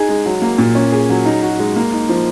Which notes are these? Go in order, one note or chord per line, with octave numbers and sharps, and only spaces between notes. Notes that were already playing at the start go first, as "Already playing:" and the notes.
Already playing: D#4 G#4
G#3
F#3
A#3
A#2
C#4
G#4
F#3
D#4
F#4
G#3
A#3
D#4
F3